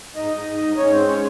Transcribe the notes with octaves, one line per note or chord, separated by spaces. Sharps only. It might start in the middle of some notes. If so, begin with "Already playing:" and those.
G#2 D#4 D#5
G#2
G#2
G#2
G#2 C#4 C#5
G#3 C4 C5
C#4 C#5